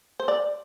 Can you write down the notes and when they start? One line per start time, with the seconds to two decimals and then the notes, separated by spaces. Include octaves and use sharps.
0.20 C5
0.28 D5